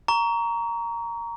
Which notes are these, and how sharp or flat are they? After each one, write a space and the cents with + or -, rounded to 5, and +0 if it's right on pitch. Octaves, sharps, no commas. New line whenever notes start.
A#5 +0 C#6 +30